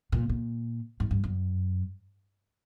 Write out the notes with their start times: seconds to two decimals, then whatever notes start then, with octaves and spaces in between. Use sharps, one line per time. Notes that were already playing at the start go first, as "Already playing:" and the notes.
0.12 A#2
0.29 A#2
1.00 G#2
1.11 G2
1.24 F#2